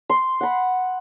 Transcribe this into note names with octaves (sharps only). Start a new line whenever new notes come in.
C6
F#5 B5